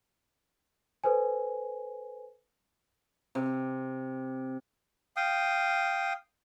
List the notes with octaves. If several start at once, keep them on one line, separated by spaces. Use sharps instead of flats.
A4 B4 C5 G#5
C3
F5 G5 D#6